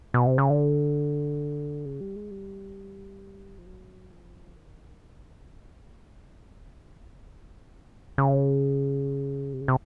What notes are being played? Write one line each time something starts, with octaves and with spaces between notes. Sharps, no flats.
B2
C3
C#3
D3
C#3
G3
G#3
G3
F3
F#3
F3
D#3
D3
C#3
C#3
C3
C#3
C3